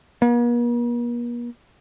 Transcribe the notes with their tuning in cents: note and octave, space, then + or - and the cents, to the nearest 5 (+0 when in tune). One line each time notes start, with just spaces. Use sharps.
A#3 +45